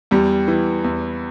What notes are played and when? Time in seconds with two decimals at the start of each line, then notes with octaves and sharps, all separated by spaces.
0.11 E2 G3
0.48 E3
0.84 E2